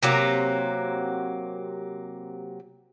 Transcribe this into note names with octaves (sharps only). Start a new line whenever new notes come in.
C3 F#3 A#3